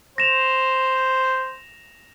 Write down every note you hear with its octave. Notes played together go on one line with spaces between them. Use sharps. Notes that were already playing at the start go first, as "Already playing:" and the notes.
C5 A#6 E7 F7